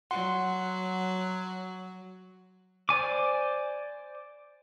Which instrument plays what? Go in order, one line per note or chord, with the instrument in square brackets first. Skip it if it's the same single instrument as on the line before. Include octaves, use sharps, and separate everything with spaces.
[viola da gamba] F#3 [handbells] F#5 C6
[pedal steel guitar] C5 D5 G#5 D6